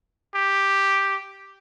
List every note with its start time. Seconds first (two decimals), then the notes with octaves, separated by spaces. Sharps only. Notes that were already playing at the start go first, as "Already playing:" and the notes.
0.35 G4